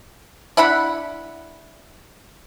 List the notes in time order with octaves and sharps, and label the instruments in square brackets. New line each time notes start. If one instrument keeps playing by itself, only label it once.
[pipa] D4 E4 F#5 B5